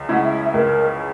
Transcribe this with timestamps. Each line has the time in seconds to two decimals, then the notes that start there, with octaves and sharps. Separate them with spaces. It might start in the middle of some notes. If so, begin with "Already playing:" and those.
Already playing: C#2
0.09 C#3 G#3 C#4 E4 F#5
0.24 E5
0.54 C#2 A#4